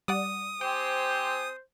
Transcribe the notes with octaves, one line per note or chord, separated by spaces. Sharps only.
G3 D5 F#5 D#6
C4 G4 C5 G5 G#5